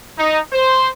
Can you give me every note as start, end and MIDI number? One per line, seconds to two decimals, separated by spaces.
0.17 0.39 63
0.52 0.88 72